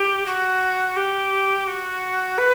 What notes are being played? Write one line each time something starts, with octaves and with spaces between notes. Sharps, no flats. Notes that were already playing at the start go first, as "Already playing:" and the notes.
Already playing: G4
F#4
G4
F#4
B4